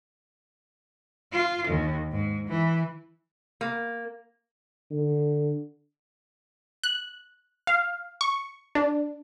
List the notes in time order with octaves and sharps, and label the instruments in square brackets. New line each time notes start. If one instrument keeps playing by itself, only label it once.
[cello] F4
D#2
G#2
E3
[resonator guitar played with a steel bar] A#3
[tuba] D3
[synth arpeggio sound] F#6
F5
C#6
D4